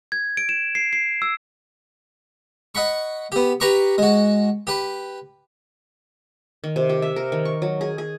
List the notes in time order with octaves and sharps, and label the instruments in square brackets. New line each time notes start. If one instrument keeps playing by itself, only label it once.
[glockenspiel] G#6
D7
E7
C7
C7
E6
[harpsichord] D#5 F#5 B5 C#6
B3 G4
G4 B4 A#5 B5 C#6 D6
G#3 F#4
G4 B4
[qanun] D#3
C3
G4
E5
A#4
D#3
C#6
F#3
G#4
G#4